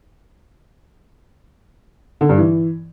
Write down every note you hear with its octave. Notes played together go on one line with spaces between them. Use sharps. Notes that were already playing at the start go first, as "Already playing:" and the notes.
D3
G2
E3